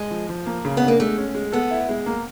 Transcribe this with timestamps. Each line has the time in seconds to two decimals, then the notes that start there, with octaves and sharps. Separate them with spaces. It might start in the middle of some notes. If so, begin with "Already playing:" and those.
Already playing: G#3
0.11 F3
0.29 F3
0.46 A#3
0.65 C#3
0.77 B3
0.83 D4
0.88 A#3
1.00 G#3 A3
1.18 C#4
1.35 G#3
1.52 B3 A4
1.71 E4
1.89 G#3
2.06 A#3